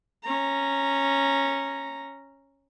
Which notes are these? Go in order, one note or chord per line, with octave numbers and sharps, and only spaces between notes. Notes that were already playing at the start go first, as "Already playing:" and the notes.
C#4 A#5